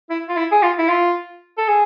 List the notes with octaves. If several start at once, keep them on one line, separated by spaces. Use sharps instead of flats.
E4
F4
E4
G#4
F4
E4
F4
A4
G#4